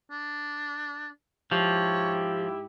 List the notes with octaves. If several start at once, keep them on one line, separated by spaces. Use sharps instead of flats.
D4
G#2 F3 E4 G4 C#5